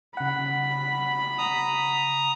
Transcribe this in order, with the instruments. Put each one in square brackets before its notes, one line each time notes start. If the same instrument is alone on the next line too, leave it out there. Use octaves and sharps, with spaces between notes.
[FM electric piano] C#3 F#5 [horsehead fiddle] B5
[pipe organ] A#5 D#6